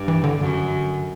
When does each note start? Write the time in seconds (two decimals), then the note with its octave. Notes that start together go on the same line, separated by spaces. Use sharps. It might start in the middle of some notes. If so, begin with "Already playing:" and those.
Already playing: G2
0.08 E3
0.24 D3
0.40 F#2